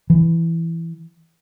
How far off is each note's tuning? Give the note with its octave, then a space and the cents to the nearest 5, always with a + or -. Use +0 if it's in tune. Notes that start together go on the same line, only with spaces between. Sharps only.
E3 +10